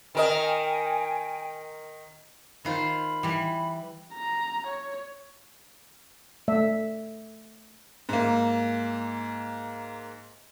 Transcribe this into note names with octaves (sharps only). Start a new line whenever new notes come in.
D#3 A#4 D#5 G5 G#5
D#3 F4 C5 B5
E3 G3
A#5
C#5
A3 D5 E5
G#2 A#3